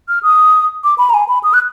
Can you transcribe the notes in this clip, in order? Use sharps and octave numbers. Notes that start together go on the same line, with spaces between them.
F6
D#6
D6
B5
A#5
G#5
B5
D#6
F#6